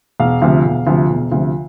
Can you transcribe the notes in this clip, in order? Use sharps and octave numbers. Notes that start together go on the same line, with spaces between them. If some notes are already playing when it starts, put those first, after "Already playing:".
E1 F5
D2 C3 F3
E1
D2 C3 F3
E1
D2 C3 F3